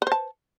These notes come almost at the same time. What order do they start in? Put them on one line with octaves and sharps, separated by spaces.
B4 C5 A5